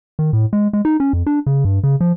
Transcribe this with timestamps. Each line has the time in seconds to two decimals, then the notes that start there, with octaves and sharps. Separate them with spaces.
0.19 D#3
0.33 A2
0.53 G#3
0.73 G#3
0.85 D#4
1.00 C#4
1.13 F2
1.27 D4
1.46 C#3
1.65 G2
1.84 C#3
2.01 F3